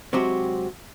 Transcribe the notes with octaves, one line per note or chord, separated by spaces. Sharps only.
C3 F#3 G#3 C4 F#4 G4